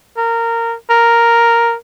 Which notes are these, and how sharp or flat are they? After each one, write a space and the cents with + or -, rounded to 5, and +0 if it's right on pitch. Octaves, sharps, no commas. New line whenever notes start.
A#4 -15
A#4 +0